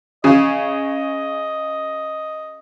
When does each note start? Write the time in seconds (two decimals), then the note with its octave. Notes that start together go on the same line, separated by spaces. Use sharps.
0.24 C#3 D#5